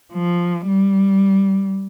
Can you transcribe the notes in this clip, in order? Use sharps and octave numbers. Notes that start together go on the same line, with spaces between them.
F3
G3